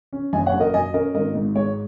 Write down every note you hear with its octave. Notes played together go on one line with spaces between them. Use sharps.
C#4
F#1 D#5 G#5
C#5 F#5
F#2
A#4 D#5
F#3 D#5 G#5
C#4 A#4 D#5
G#1 A#4 D#5
G#2
G#3 C#5